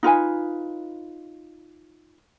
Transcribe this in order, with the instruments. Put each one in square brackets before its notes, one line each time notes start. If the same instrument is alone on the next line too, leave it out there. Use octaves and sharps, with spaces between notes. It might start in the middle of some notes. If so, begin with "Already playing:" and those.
[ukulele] D#4 F4 B4 G#5